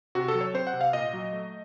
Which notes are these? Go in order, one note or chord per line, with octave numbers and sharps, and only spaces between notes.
C3 F#4
A4
F#3
C#5
C4 C5
F#5
C3
F5
A#2 D#5
F#3
A3